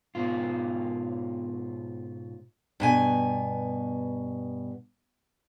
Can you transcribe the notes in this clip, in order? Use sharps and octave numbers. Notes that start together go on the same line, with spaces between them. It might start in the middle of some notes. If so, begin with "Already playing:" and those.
G#2 B2 F4
G2 B2 G#5